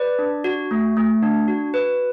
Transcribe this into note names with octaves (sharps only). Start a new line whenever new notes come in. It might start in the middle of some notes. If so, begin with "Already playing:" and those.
Already playing: B4 D5
D4
F#4
A3
A3
D4
F#4
B4